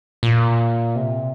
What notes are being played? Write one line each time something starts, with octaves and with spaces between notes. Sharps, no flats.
A#2
C3